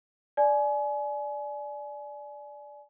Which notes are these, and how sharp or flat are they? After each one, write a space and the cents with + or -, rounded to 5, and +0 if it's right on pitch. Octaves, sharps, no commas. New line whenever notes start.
D5 +0 G#5 +30